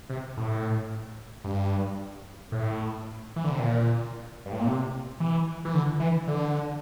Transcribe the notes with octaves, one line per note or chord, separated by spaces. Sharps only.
C3
A2
G2
A2
E3
D3
C3
A#2
G2
A2
A#2
C3
E3
E3
D3
E3
D3